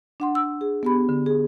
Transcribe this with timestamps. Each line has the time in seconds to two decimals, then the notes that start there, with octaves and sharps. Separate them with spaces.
0.20 D4 F#5 C6
0.35 E6
0.61 G#4
0.83 B3 G4 B5
1.09 D3
1.26 G#4